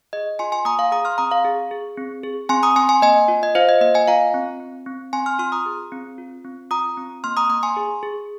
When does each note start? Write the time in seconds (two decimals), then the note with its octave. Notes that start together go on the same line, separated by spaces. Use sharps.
0.13 G#4 D#5
0.39 F4 G#5 C6
0.52 G#5 C6
0.65 A#3 A#5 D#6
0.79 F5 A#5
0.92 G#4 A#5 D#6
1.05 C6 F6
1.18 C4 A#5 D#6
1.31 F5 A#5
1.44 G#4
1.71 G#4
1.97 C4
2.23 G#4
2.49 C4 G#5 C6
2.63 A#5 D#6
2.76 C4 G#5 C6
2.89 G#5 C6
3.02 A#3 D#5 G#5
3.28 F4
3.43 D#5
3.55 F4 C5 F5
3.69 D#5
3.81 A#3 D#5
3.94 D#5 G#5
4.08 F4 F5 A#5
4.34 C4
4.60 C4
4.86 C4
5.13 C4 G#5 C6
5.26 C6 F6
5.39 F4 C6 F6
5.52 A#5 D#6
5.66 G#4
5.92 C4
6.18 F4
6.45 C4
6.71 F4 A#5 D#6
6.97 C4
7.24 A#3 C6 F6
7.37 A#5 D#6
7.50 A#3 A#5 D#6
7.63 G#5 C6
7.77 G#4
8.03 G#4